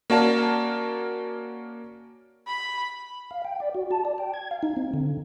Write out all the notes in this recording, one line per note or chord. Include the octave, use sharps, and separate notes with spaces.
A#3 C#4 F#4 D5 F5 A5
B5
F5
G5
D5
F#4
A5
D5
G5
G#6
F5
D#4
C4
D3